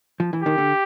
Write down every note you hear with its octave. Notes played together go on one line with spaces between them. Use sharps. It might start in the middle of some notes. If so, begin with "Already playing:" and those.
F3
E3
D#3 G4
D3